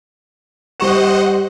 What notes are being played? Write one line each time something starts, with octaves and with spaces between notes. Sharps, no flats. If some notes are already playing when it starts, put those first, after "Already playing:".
G3 C5 D#5 F#5 C#6 E7